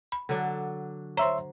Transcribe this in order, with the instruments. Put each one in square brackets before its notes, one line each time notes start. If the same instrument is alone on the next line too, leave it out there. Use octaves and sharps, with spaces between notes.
[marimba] B5
[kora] D3 F#3 D4
[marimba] C5 A#5 [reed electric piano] C#5 E5 C6